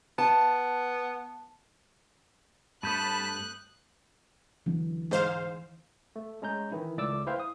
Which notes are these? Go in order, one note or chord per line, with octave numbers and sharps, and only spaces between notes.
B3 A5
G2 A3 A5 B5 D#6 F#6 G6 D#7
D2 E3 F#3 C#4
G#2 C5 F5
A3
G#3 C#4 A#5 G6
D#3 E3 E4
C#2 A3 D5 D6 E6
E4 B4 C5 F5 G5
D#6